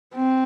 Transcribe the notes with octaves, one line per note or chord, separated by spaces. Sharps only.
C4